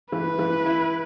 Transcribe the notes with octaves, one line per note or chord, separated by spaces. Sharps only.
E3 B4
E3
E4